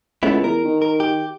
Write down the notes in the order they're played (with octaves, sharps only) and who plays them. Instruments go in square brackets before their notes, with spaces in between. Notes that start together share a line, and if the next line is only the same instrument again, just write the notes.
[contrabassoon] C#2 [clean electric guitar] A3 B3 E4
[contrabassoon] E2 [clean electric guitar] A#4
[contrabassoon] D#3
[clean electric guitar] A#4
G4